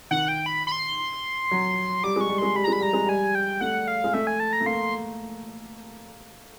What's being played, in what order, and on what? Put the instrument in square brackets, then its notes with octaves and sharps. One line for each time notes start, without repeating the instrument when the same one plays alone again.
[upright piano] D#3 [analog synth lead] F#5
[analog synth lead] G5
B5
B5
C6
[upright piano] F#3
[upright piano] G3 [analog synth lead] D6
[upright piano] G#3 [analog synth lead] C#6
[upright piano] G3
[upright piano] G#3 [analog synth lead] C6
[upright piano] G3 [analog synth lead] B5
[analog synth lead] A#5
[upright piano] G#3 [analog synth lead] B5
[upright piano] G3 [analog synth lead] A#5
[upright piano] G#3
[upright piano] G3 [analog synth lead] G#5
[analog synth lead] G5
[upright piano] A3 [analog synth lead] F#5
[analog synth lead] F5
[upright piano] G#3
[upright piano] A3 [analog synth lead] E5
[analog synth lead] G#5
A5
A#5
[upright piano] A3
[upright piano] A#3 [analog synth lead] C6